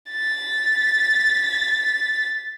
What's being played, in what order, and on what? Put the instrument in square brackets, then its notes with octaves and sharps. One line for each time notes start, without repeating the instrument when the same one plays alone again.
[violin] A6 B6